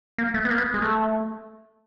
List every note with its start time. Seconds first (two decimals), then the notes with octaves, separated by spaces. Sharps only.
0.18 A#3
0.34 A3
0.45 B3
0.50 A#3
0.58 B3
0.74 G#3
0.82 A3